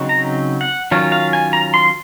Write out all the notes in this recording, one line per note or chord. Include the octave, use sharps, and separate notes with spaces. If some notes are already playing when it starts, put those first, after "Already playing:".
Already playing: C#3 F#3 C4 D#4
A#5
F#5
D#3 F#3 C#4 F4
F5
G#5
A#5
C6